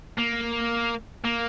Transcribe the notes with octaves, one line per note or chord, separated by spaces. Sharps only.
A#3
A#3